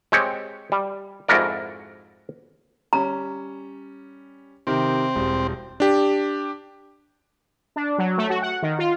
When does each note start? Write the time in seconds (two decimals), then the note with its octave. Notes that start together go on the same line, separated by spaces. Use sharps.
0.12 G#3 C4 G4 C#5
0.72 G3
1.28 F2 G#2 E4 F#4 A#4 D5
2.93 G3 C#4 A#5
4.67 C3 D#3 C4
5.15 E1 G3
5.80 D4 G4
7.76 D4
7.98 F#3
8.18 A3
8.30 F#4
8.42 F#5
8.62 D#3
8.79 F4